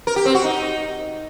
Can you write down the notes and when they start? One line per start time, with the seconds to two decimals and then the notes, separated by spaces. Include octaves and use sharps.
0.07 A#4
0.16 G4
0.25 C4
0.35 F#4
0.44 D#4